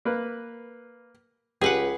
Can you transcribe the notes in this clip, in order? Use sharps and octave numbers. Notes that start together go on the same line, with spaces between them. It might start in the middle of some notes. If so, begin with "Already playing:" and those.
A#3 B4
C#2 G4 G#4 B4 F#5